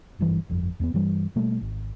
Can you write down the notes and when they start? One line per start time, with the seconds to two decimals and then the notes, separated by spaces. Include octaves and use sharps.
0.19 G#1 G2 E3
0.49 G1 F2
0.80 E2 A#3 B3
0.94 G2 E3 G3
1.36 B2 G3 A3 A#3
1.61 G#1